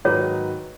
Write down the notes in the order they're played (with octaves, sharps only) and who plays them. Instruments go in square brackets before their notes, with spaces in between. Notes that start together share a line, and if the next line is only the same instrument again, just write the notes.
[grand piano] G#2 D#3 F#3 D#4 B4 [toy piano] G#4 C#5